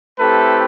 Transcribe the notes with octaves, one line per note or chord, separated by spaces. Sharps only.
A3 C4 E4 G4 A4 B4